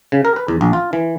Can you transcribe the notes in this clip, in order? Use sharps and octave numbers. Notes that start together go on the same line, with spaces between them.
C#3
A#4
B4
E2
A#1
F4
E3